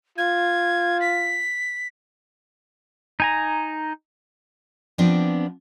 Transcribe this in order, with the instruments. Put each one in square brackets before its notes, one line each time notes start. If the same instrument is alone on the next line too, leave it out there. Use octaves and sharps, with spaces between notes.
[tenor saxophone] F4 [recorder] G#6
[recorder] B6
[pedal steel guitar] D#4 G#5 A#5
[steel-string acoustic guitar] F3 B3 C4 D4